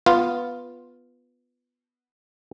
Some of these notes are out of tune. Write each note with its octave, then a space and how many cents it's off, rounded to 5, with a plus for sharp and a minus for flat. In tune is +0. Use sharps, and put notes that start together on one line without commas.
B3 +0 F4 +0